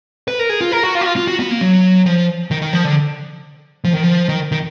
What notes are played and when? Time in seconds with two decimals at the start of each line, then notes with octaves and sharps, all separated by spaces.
0.28 B4
0.39 A#4
0.49 G#4
0.61 F4
0.72 A#4
0.83 F#4
0.95 F4
1.01 F#4
1.06 F4
1.16 F4
1.28 F#4
1.40 B3
1.51 A#3
1.61 F#3
2.06 F3
2.51 D#3
2.62 D#3
2.73 F3
2.84 D3
3.84 F3
3.93 D#3
4.03 F3
4.29 D#3
4.52 D#3